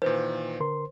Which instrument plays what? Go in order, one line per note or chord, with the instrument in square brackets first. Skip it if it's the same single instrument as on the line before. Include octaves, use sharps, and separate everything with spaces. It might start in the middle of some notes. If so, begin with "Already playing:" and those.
[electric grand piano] A#2 D#3 E3 [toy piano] B4 [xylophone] C5
[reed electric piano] D3 A#4 C6